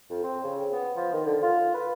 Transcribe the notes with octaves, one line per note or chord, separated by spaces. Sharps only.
F2
C4
C#3
B3
F3
D#3
D3
F4
B4